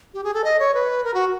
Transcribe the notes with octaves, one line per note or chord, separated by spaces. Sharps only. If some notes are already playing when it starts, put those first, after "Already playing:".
G4
G#4
A4
D#5
C#5
B4
A#4
F#4